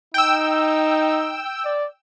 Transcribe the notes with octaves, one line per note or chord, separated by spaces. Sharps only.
D#4 G5 E6
D5